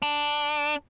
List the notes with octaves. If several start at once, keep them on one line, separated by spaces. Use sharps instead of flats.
D4